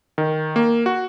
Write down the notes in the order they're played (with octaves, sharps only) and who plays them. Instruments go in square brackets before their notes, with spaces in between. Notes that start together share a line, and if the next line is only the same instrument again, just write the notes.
[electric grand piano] D#3
A#3
F#4